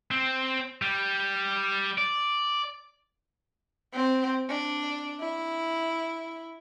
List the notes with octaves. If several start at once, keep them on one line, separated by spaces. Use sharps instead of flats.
C4
G3
D5
C4
D4
E4